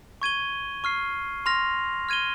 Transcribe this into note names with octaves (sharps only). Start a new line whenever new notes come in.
C#6 G#6 D#7 G7
C#6 F6 C7
C6 F6 A#6 F7
F6 G#6 D#7 G7